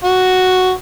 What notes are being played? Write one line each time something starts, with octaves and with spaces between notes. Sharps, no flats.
F#4